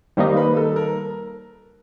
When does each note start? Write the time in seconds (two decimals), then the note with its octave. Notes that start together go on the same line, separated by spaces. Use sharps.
0.17 D#3 G3 A#3 D#4 C5
0.37 B4
0.57 A4
0.76 A#4